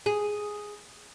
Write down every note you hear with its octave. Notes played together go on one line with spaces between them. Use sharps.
G#4